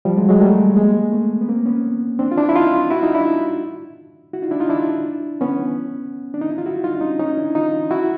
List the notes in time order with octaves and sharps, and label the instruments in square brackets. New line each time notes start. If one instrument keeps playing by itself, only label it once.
[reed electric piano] F3 G3
F#3 G#3
F#3 G#3
G3 A3
G#3 A#3
A3 B3
B3
A#3 C4
B3 C#4
C4 D4
F4
D4 E4
E4
D#4 F4
E4 F#4
D#4 F4
D4 E4
E4 F#4
D#4 F4
D4 E4
D#4 F4
D4 E4
B3 C#4
D4
D#4
E4
F4
E4 F#4
D#4 F4
D4
C#4 D#4
C#4 D#4
D4 E4
D#4 F4
E4 F#4